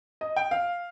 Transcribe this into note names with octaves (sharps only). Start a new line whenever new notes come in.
D#5
G5
F5